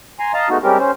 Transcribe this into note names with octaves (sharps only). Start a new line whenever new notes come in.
G#5 A#5 C6
D#5 F5 A5 A#5
G#3 A3 B3 D#4 F#4
G3 G#3 C4 C#4 G4 A#4
C#4 C5